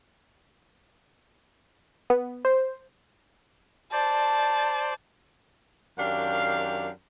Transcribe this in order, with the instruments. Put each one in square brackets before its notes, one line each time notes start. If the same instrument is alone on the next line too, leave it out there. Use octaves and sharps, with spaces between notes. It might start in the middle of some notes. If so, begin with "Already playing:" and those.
[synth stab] B3
C5
[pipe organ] C5 D5 [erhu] A5
[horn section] F#2 D#3 D4 G4 F5